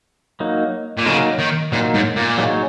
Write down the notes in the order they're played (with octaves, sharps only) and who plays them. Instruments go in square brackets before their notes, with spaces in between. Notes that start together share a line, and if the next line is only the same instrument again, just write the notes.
[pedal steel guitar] F#3 A#3 D#4
[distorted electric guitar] A#2
[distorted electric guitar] C#3 [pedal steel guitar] F#3 A#3 D#4
[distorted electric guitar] D#3
[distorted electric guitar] A#2 [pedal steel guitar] F#3 A#3 D#4
[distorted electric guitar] G#2
A#2
[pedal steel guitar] F#3 D#4 G#4 C#5